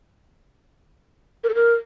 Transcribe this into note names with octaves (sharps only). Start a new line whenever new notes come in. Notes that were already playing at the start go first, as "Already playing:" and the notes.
A#4
A4
A#4